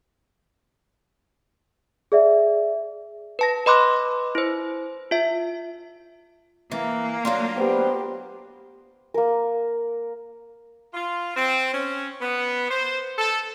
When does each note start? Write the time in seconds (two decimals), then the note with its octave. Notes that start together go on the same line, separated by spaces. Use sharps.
2.12 G#4 D5 E5
3.39 B4 A5 A#6
3.66 B4 D#5 B5 C6 D6 F#6
4.35 E4 C5
5.11 F4 E5
6.72 E3 A#3
7.25 F#3 D4 F4
7.57 B3 G4 C5
9.14 A#3 A#4
10.94 F4
11.37 C4
11.74 C#4
12.22 B3
12.71 C5
13.18 A4